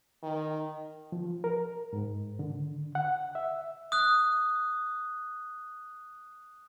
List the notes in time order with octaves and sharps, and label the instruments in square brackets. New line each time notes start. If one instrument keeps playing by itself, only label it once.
[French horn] D#3
[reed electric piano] F3
A#4
G#2
D3
F#5
E5
[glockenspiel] D#6 F#6